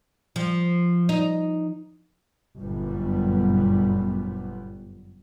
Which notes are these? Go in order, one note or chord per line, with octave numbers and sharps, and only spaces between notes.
F3
D#4
G1 F#2 A#2 G3 B3